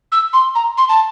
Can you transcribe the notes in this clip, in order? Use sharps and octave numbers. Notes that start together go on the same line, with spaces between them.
E6
C6
A#5
C6
A5